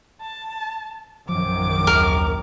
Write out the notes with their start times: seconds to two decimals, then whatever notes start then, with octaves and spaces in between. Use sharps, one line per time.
0.22 A5
1.29 A#1 F#2 D#3 F3 D6
1.87 D#2 A#4